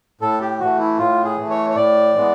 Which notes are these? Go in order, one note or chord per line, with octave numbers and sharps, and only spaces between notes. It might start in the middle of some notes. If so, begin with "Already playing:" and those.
A2 A4
G4
E3 A3 F#4
E4
A2 F4
G#4
E3 A3
C#5
C#5
A2 D5
E3 G#3 B3